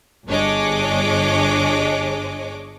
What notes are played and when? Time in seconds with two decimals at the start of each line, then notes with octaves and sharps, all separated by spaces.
0.27 G1 D4 G#4 C#5 D#5 D6